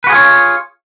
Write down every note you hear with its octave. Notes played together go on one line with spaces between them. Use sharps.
F4 F#4 G#4 B4 C#5